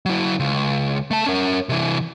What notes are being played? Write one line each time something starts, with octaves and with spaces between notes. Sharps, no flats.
F#3 E4
C#2
A3 A5
C#4 A#4
C3 E3